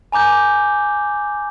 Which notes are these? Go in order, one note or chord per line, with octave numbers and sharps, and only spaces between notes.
G#5 A#5 D6 G6